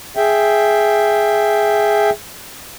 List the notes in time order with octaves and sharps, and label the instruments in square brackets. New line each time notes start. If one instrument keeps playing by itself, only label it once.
[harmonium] G#4 E5 G5